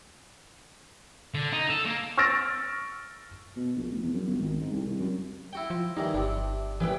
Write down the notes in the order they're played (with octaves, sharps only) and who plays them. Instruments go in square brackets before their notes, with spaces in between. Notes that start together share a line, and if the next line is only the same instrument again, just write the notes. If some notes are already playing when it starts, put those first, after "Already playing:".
[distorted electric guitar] D3
D#4
A4
A#3
[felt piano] C#6 E6 F6 A6 A#6 D7
[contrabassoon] B2
A#1
F1
E2
F#2
G1
G#1
G#2
C2
C2
F#2
[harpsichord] E4 F#4 G5
[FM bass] F3
[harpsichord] G2 D#3 E3 [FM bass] D#4
[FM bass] G1 [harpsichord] C3 D4
[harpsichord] A1 D2 [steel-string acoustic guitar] E3 B4 G5